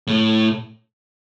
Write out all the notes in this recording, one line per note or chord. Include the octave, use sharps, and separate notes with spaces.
A2